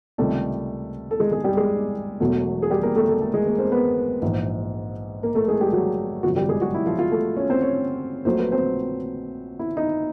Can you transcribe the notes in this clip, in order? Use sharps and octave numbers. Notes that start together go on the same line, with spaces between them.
C#2 C3 D#3 G3 A3 A4
A4
G#3 G#4
G#3 G#4
G3 G4
G#3 G#4
E1 E2 B2 F#3 A3
G#4
G3 G4
A#3 A#4
A3 A4
A3 A4
A3 A4
G#3 G#4
A#3 A#4
C4 C5
B3 B4
A#1 G#2 E3
A#3 A#4
A3 A4
G#3 G#4
G3 G4
F#3 F#4
G#1 F#2 C#3 F3 F#3 F#4
G3 G4
G#3 G#4
F#3 F#4
E4
F3 F4
F3 F4
A3 A4
C#4 C#5
C4 C5
C#4 C#5
A#1 A#2 F#3 A3 C5
B4
C4 C5
E4
D#4